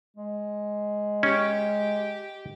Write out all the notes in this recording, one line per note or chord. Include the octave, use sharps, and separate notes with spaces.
G#3
C#4 G4